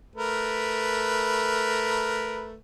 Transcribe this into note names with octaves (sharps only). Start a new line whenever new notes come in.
A3 A#4 B4